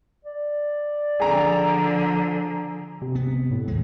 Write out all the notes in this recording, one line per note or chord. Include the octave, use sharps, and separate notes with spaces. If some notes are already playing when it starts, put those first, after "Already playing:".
D5
D3 F3 G#4 A#5
C3
B3
A2
D#2 G#3